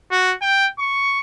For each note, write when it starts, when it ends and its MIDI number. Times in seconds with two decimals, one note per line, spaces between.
0.11 0.34 66
0.42 0.68 79
0.79 1.20 85